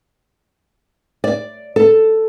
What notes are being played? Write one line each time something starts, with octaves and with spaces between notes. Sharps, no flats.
D5
A4